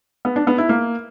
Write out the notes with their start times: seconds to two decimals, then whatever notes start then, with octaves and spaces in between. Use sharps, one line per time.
0.25 B3
0.36 D4
0.47 B3
0.58 E4
0.69 A#3